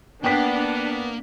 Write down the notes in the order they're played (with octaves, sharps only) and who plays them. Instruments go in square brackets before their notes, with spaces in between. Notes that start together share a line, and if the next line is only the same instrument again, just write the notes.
[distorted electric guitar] A#3 [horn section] B3 [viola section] D4 [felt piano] G5 B6